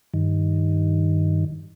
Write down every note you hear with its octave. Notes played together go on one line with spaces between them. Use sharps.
G2 D#3